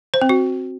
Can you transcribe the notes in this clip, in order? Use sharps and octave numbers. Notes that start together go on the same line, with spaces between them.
C5
C4
F#4